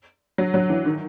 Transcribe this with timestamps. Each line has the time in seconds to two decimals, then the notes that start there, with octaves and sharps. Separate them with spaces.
0.38 F#3
0.54 F#3
0.70 E3
0.86 D#3